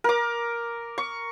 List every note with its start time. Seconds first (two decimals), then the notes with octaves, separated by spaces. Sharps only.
0.04 A#4 D6
0.98 C#6